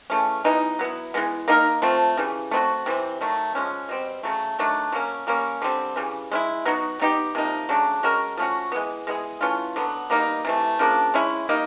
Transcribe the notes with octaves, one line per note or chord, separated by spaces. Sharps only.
C#3 E3 A3 C#4
E3 G3 B3 D#4
F#3 B3 E4
E3 G#3 B3
A#3 D#4 G4 A#4
F3 A3 C4
C#3 E3 G3
A3 C4 D#4 F#4
C3 E3 G3 C4
D#3 F#3 A3
F3 G#3 C#4
B2 G3 C4
C#3 F#3 A3
D#3 F#3 A3 D4
F#3 A#3 C#4
G3 A#3 C#4
D3 G3 C4
C#3 E3 G3
G#3 C#4 E4
F#3 B3 D#4 F#4
G3 B3 D#4 G4
C3 F3 A#3 D#4
C#3 F#3 A3 D4
G#3 C#4 F#4 A#4
F3 A3 C#4 F#4
E3 G#3 B3
G#3 B3 E4 G#4
E3 A3 C#4 F4
D3 F#3 B3
B2 G3 A#3 D#4
C3 E3 A3
C#3 F3 A#3 D4
G#3 C#4 E4
G3 A#3 D#4